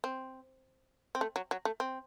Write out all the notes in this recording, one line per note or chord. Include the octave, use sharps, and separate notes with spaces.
C4
C4
A3
F#3
F#3
A3
C4